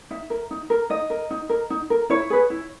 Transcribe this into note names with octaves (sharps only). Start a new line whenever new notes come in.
D#4 E5
A#4
D#4
A#4
D#4 D#5
A#4
D#4
A#4
D#4
A#4
E4 C#5
G#4 B4
E4